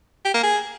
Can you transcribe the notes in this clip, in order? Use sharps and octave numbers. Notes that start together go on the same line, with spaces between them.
G4
A#3
G#4